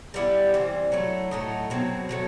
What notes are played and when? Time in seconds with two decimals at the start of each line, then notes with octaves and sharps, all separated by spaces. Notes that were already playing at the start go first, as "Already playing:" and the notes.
0.14 G3 B3 E4 G4
0.54 E3 G3 C4
0.92 F#3 A3 E4
1.31 A2 F#3 A3 D#4
1.70 B2 F#3 C4
2.09 B2 F#3 A3